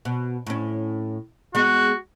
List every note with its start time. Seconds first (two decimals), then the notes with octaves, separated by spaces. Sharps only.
0.05 B2
0.47 A2 C#4
1.55 G#3 B3 F#4